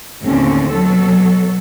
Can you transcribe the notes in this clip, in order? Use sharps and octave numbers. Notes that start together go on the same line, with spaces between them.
D#2 A2 D3 C4 C#4
B2 F#3 A4